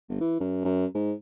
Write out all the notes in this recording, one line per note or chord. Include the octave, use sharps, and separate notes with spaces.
G1
E3
F#2
F#2
G#2